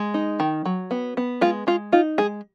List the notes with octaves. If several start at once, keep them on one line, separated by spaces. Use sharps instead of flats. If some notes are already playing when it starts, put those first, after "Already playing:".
Already playing: G#3
D#4
D#3
F#3
B3
B3
G#3 F4
G#3 F4
D#4 F4
G#3 G#4